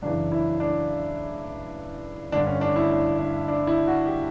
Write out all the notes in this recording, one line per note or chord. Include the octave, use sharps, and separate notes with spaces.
F#2 C#3 E3 D4
E4
D4
G2 D3 D4
C#4
D4
E4
D4
D4
D4
E4
F#4
G4